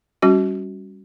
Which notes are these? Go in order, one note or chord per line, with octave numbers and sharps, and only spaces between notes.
G3 C#4 F#4